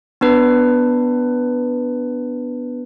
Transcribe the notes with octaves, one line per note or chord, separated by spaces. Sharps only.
B3 D4 B4